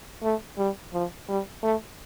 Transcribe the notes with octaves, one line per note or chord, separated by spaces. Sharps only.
A3
G3
F3
G3
A3